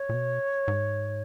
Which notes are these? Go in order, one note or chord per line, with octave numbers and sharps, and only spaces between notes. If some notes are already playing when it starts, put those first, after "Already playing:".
Already playing: C#5
A#2
B2
G#2